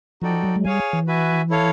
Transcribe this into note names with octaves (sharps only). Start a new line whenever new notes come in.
F3 D#4 F#4 A4 D5 G5
F#3
G#3
G3 G#4 C#5 F5 G#5
E3
F#4 B4 E5 G#5
E4 A4 C#5 F5